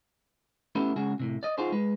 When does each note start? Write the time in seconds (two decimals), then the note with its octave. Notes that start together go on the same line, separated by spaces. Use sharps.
0.75 A3 B3 C#4 E4 G4 A4
0.96 C#3 G#3 F#4 G#4
1.20 A2 C3
1.43 D5 D#5
1.58 D#4 F4 F#4 G#4 C5
1.72 G#3 B4